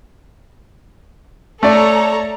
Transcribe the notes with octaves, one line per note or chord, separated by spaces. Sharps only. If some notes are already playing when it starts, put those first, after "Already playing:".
A3 A4 C#5 D5 A#5